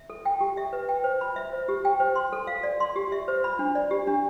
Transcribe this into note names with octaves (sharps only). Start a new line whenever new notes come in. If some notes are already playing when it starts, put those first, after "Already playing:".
Already playing: E5
A4
G5
G4
E5
B4
G5
C5
B5
E5
C5
G4
G5
C5
C6
A4
F5
D5
C6
G4
E5
C5
B5
D4
D5
G4
D4